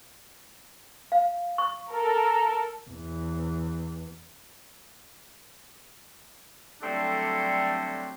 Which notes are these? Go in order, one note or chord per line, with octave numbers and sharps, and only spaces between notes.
F5
C#6
A4 A#4
E2
D3 F#3 G3 A3 C4 D4